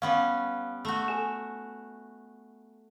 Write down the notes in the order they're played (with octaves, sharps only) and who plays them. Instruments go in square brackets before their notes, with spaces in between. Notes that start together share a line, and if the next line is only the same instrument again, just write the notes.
[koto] G3 B3 C#4 [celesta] F5
[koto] A3 F#4
[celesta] A4 G#5 E7